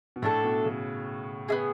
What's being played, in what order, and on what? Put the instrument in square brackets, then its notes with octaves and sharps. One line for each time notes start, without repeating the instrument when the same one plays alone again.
[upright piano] B2
[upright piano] A2 [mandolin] A3 D4 A4
[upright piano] B2
C#3
[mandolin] B3 E4 G#4